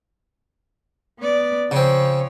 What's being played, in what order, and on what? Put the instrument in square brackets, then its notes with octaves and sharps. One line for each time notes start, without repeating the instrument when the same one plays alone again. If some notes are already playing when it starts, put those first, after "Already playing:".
[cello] B3 D5
[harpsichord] C#3 C4 [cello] F3 C#5